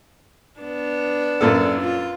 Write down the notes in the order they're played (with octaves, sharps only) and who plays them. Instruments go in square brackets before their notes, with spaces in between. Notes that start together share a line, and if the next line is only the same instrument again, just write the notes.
[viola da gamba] B3 D4
[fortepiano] F#2 A#2 A4
[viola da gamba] F4